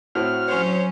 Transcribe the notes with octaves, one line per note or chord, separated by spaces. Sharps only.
A2 C4 F#4 F6
F#3 C#4 C5 C#5